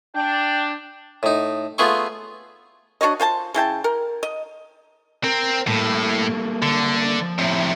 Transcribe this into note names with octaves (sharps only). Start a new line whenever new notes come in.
D4 G5
A2 D#4
A3 B3 F4 G#4 C6 C#6
D4 F#4 C#5 D#5
F4 C5 G#5 A5
C#3 E4 G5 A5
A#4
D#5
C4 A#4
A2 G3 A#3 A4
D3
F3
A2 C3